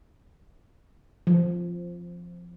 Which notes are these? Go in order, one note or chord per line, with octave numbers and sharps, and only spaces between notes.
F3